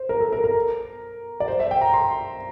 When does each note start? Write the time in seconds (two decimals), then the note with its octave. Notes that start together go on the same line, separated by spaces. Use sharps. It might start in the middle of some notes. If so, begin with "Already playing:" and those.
Already playing: C5
0.09 A#4
0.21 A4
0.33 A#4
0.44 A#4
1.40 D5
1.48 C5
1.60 E5
1.71 G5
1.81 A#5
1.94 C6